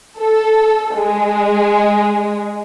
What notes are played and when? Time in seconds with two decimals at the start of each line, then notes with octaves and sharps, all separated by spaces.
0.19 A4
0.97 G#3